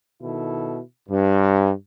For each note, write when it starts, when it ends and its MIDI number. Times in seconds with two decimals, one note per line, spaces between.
0.22 0.79 47
0.22 0.79 51
0.22 0.79 64
0.22 0.79 69
1.09 1.71 43